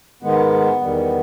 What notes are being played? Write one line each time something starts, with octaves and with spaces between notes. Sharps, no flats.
G#2 D#3 G#3 B3
E2 D#3 G3